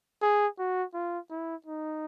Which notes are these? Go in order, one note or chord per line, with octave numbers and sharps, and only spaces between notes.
G#4
F#4
F4
E4
D#4